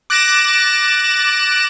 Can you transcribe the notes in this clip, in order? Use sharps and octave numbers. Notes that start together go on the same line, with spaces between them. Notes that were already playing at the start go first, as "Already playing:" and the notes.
D6 F#6 A6 A#6 D7 E7